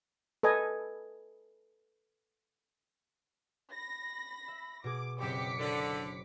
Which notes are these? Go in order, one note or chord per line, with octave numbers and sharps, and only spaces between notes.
A4 B4 D#5 G#5
B5 A#6
E5
B2 G#4 D6
F#1 C4 G4 D#5 D6 B6 C#7
D3 A#4 C5